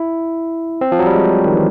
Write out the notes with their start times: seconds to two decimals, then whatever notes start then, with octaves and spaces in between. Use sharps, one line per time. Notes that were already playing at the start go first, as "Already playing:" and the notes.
Already playing: E4
0.81 C4
0.92 F3
0.99 F#3
1.06 G3
1.14 G#3
1.46 D#3
1.54 E3